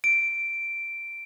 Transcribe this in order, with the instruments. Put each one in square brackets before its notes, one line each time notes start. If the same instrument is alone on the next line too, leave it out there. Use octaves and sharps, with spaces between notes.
[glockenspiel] D7